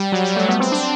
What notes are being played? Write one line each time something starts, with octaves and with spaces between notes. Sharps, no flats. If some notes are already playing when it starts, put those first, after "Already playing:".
Already playing: G3
F#3
G3
A3
B3
C4
D4